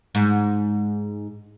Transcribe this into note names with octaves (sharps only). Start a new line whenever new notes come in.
G#2